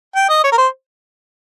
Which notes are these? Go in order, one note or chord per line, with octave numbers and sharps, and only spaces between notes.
G5
D#5
C#5
A#4
C5